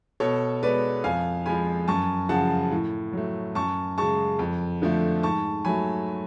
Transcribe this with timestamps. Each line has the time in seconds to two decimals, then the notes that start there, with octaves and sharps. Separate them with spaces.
0.20 B2 A4 C#5
0.62 G#3 B3 B4 D5
1.04 F2 F5 G#5
1.46 F3 G#3 G#5 B5
1.88 F#2 A5 C#6
2.29 C#3 F3 F#5 A5
2.71 A2
3.13 F#3 A3
3.55 F#2 A5 C#6
3.98 C#3 G#3 A5 C#6
4.39 F2
4.82 D3 F3 A3
5.23 G#2 A5 C#6
5.65 F#3 A3 G#5 B5